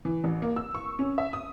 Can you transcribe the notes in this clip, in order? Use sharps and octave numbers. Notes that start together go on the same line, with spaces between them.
E3
A1
A#3
E6
C#6
C#4
E5
D#6